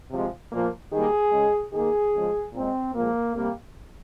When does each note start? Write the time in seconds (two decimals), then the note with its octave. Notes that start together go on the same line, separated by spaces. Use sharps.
0.11 C3 F3 G#3
0.52 A#2 F3 A#3
0.92 D#3 G3 A#3 G#4
1.32 C#3 G#3
1.73 D#3 A#3 G#4
2.13 C#3 F3 G#3
2.53 A#2 G#3 C4
2.94 A#2 F3 G#3 A#3
3.35 C3 G3 A#3